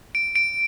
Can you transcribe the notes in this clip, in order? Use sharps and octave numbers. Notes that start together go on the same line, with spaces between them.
D7
D7